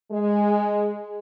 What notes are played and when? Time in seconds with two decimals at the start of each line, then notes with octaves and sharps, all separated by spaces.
0.12 G#3